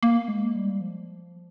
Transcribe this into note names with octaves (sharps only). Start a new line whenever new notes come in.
A#3
G#3
G3
F3